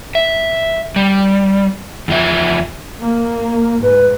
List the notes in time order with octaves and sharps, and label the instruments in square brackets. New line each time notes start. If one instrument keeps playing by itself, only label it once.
[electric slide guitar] E5
G3
E2 F3 E5
[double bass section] A#3
[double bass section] G#2 [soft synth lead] B4